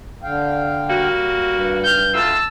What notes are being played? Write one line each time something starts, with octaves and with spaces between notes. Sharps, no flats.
D3 F5 G5
G3 A#3 F#4
G2
F6 G6
D2 E4 F4 A5 E6